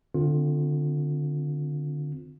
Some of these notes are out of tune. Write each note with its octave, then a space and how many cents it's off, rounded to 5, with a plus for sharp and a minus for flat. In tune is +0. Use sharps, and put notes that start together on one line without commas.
D3 +10 C4 -15 F4 +20